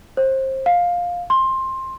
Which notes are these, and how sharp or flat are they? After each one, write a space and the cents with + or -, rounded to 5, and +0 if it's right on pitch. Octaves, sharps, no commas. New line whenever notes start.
C5 +25
F5 +10
C6 +15